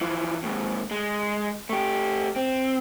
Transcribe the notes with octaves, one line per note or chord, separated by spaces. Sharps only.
E3 F3
D#2 G#2
G#3
A3 G4
C4